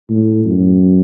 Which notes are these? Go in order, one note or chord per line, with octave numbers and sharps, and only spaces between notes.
A2
F#2